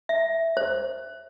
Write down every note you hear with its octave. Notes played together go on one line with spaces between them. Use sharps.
E5
C5